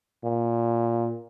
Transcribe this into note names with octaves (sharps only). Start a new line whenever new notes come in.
A#2